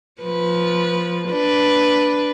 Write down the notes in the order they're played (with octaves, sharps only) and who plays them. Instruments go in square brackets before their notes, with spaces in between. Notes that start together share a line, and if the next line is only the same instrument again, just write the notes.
[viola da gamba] F3 B4
D4 B4